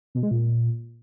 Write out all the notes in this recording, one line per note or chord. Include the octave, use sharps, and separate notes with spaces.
B2
G#3
A#2